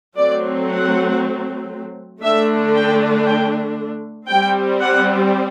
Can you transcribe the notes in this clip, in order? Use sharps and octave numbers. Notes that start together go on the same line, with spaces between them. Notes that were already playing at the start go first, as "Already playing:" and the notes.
F#3 A3 C4 D5
F#5
D3 A3 D4 E5
G5
G5
G3 C4 G5
F#5